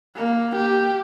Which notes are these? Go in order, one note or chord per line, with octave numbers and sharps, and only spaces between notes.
A#3
G4